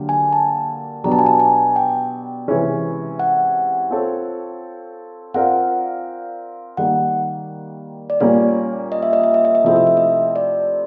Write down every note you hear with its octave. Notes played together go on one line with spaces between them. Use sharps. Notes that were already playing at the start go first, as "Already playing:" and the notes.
Already playing: D3 F#3 A#3 D4 G4
G#5
A5
B2 F#3 B3 D4 G4 A#5
A5
G#5
A5
G#5
G5
C3 E3 G#3 C#4
F#5
C4 F4 A4 C#5
C4 F4 A#4 D5 F5 F#5
D#3 G3 A#3 F#5
D5
A#2 G3 A#3 C#4 C#5
D#5
E5
D#5
E5
D#5
E5
D#5
C3 F3 A3 C4 E4 E5
D#5
E5
D#5
D5